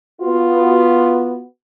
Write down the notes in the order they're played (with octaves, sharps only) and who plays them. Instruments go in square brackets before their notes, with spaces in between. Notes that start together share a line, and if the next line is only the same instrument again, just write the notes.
[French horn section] B3 F4 F#4